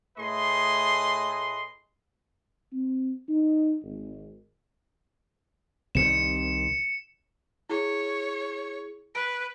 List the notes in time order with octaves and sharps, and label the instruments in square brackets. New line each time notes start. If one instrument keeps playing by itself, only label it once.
[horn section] A2 A3 G#4 B4 D#5 C6
[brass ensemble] C4
D#4
G#1
[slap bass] C2 C3 D#3 [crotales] C#7 E7
[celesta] E4 G#4 [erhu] C#5
[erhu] B4 [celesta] D7